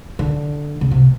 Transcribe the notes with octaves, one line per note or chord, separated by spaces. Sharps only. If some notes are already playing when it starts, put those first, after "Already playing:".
D3
C#3
C3